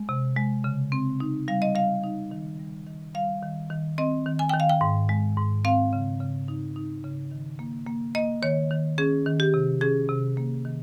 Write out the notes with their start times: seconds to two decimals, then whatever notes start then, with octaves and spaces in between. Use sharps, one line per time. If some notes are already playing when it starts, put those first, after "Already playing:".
Already playing: G#3
0.09 C3
0.37 G#3
0.64 C#3
0.92 C4
1.20 D#4
1.48 G3 F5
1.62 D#5
1.75 G3 F5
2.04 D#4
2.31 D#3
2.59 G3
2.87 D#3
3.14 G3 F5
3.43 D#3
3.70 D#3
3.98 C4 D#5
4.26 D#3
4.39 G#5
4.49 D#3 G5
4.60 F5
4.69 G5
4.81 G#2
5.09 G#3
5.37 G#2
5.65 C4 F5
5.93 C#3
6.20 C#3
6.48 D#4
6.76 D#4
7.04 C#3
7.31 D#3
7.59 A#3
7.87 A#3
8.15 A#3 D#5
8.42 D#3 C#5
8.70 D#3
8.98 C#4 G#4
9.26 D#3
9.40 G4
9.54 C3
9.81 C#4 G#4
10.09 C3
10.37 A#3
10.65 D#3